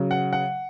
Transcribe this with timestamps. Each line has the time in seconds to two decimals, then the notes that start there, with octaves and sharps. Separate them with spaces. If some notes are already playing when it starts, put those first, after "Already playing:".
Already playing: C#3 F#3
0.11 F#5
0.33 F#5